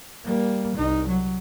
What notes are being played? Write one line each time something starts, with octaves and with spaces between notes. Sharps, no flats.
G3 A#3
C2 D#4
F#3